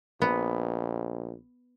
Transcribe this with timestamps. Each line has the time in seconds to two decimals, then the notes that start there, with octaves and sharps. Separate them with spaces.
0.22 A#1 B3